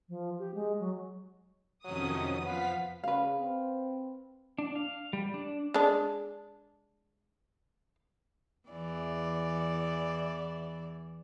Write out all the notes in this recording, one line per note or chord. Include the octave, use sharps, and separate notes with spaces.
F3
G4
G#3
F#3
F2 C3 D#3 F#3 C#4 D#6
F3 B3 F5 F#5 B6
C#3 B4 F5
C4
D4
F5
G3
D4
G#3 D4
E2 E3 D5